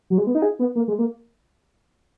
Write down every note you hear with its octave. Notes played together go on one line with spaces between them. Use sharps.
F#3
G#3
B3
D#4
G#4
B3
A#3
G#3
A#3